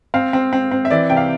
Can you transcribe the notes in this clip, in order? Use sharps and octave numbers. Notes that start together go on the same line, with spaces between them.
C4 F5
C4
C4
C4
E5
E3 D5
C3 G5
F5